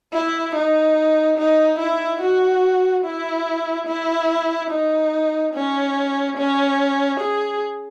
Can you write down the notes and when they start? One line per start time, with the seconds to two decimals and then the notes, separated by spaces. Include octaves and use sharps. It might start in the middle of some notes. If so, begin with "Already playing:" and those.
0.13 E4
0.55 D#4
1.38 D#4
1.79 E4
2.21 F#4
3.04 E4
3.87 E4
4.71 D#4
5.54 C#4
6.37 C#4
7.20 G#4